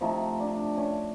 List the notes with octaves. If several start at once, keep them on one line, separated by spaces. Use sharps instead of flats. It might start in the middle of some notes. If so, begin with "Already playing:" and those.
C3 F3 A3 D#4
D4
C#4